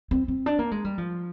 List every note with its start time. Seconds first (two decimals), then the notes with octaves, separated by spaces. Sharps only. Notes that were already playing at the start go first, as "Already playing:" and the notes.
0.11 C4
0.28 C4
0.46 D4
0.59 A#3
0.71 G#3
0.85 G3
0.98 F3